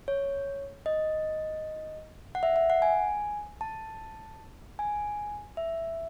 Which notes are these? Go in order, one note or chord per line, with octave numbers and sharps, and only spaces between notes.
C#5
D#5
F#5
E5
E5
F#5
G#5
A5
G#5
E5